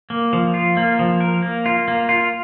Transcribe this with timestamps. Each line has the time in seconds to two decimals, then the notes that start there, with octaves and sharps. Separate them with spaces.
0.10 A#3
0.33 F3
0.54 F4
0.77 A#3
0.99 F3
1.21 A#4
1.42 A#3
1.66 F4
1.88 A#3
2.09 F4